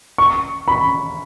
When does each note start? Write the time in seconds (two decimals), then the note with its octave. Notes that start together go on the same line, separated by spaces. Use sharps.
0.18 C#6
0.68 B5